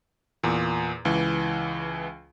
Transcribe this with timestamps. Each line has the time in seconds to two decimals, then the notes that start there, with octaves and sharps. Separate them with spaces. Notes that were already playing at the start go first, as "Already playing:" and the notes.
0.43 E2 A#2
1.05 C#2 E3